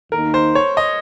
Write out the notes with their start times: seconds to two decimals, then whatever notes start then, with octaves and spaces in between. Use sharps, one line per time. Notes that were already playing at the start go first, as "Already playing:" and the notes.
0.12 D#2 D#3 A#3 D#4 A#4
0.34 C5
0.55 C#5
0.77 D#5